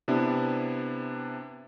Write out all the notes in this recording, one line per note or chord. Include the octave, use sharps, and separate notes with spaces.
C3 B3 D4 E4